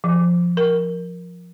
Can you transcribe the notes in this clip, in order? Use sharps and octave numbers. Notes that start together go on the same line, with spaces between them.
F3
A#4